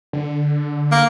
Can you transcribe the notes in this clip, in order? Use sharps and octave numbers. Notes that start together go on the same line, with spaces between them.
D3
A#3